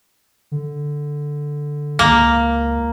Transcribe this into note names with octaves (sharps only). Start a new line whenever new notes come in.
D3
C#2 A#3